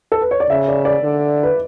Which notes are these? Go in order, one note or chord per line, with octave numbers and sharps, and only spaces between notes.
A4
B4
C#5
D5
C#3 E5
D5
D5
D3
B4